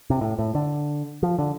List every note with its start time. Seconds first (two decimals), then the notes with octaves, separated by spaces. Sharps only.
0.10 C3
0.21 A2
0.39 A2
0.55 D3
1.23 F3
1.39 D3